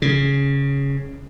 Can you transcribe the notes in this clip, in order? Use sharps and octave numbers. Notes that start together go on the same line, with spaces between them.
C#3